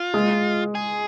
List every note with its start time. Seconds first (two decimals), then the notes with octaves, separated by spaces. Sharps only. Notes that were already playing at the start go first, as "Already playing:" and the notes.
Already playing: F4
0.14 G#3
0.75 G#4